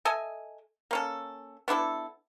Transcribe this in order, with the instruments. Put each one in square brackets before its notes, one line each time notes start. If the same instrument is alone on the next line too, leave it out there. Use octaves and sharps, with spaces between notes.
[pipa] A4 D#5 E5 G#5
A#3 C#4 A4
B3 D4 E4 A4